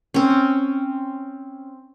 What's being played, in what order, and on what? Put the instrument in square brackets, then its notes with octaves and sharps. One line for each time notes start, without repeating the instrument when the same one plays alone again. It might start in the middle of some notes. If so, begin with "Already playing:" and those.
[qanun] C4 C#4